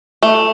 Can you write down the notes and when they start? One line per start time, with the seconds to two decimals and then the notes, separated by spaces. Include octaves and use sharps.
0.23 A3